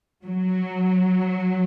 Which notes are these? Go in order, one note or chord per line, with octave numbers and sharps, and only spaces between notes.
F#3